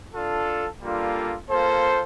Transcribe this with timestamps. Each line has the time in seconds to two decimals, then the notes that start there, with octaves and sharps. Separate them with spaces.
0.14 D4 F4 A4
0.81 G3 A#3 D4 F4 A4
1.49 A#3 F4 A4 C5